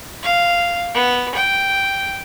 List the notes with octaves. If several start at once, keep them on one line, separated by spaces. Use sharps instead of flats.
F5
B3
G5